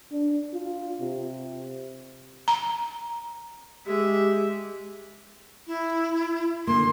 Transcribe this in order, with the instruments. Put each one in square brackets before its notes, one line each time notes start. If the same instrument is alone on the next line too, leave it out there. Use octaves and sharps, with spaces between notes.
[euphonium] D4
F4
C3
[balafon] A#5
[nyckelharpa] G#3 E5 [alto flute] G4
[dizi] E4
[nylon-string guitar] D3 A#3 [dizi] C6